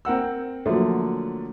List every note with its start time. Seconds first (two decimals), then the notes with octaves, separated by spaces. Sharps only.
0.05 C4 A#4 F#5 E6
0.66 D3 F3 F#3 A3 A#3